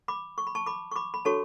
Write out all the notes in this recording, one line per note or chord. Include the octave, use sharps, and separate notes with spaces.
B5 D6
C#6
B5
A5 C#6
B5 D6
C#6
B5 D6
B5
D4 F#4 A4 C#5 A5 C#6